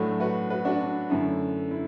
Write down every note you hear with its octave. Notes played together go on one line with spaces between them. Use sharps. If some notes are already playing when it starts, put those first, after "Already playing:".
Already playing: A2 F#3 A3 D4 F#4
F#4 B4
F#4 B4
D4 F#4
D4
F#2 D3 A3 E4
E4